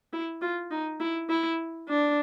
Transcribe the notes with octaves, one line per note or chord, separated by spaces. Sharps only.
E4
F4
D#4
E4
E4
D4